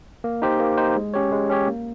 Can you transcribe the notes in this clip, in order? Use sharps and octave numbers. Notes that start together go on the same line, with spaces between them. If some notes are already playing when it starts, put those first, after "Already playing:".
A#3
D#4 G4 C5
A#3
D#4 G4 C5
G#3
C#4 G4 C#5
G#3
C#4 G4 C#5
A#3